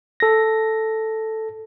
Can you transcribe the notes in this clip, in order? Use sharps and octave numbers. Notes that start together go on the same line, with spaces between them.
A4 A#6